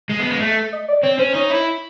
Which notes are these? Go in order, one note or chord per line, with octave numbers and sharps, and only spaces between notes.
G#3
B3
G#3
A3
D#5
D5
C4 C#5
C#4 C5
D#4 C#5
E4